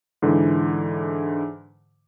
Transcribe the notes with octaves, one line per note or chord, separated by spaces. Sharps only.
G#2 D3 E3